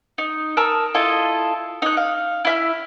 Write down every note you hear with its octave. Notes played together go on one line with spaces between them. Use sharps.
D#4
A#4 A5 D#6 E6
E4 F4 A4 D#5
D#4 F#6
F5
E4 E5 F6